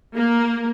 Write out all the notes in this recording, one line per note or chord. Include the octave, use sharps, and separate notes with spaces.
A#3